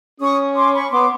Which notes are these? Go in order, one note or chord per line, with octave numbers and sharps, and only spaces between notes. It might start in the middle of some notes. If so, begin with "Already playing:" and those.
C#4 C#6 D#6
C6 D6
B5 C#6
B3 C6 D6